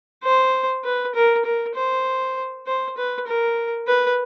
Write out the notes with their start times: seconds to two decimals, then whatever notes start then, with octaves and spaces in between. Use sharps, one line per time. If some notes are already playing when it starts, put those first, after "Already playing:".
0.24 C5
0.84 B4
1.15 A#4
1.45 A#4
1.76 C5
2.67 C5
2.97 B4
3.27 A#4
3.88 B4